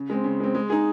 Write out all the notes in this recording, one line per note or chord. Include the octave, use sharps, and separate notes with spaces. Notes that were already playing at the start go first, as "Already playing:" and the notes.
Already playing: C#3
G#3 C4
C#3
G#3 C4
G#3
D#4 G#4